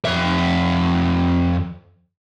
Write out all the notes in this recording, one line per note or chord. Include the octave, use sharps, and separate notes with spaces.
F2 E5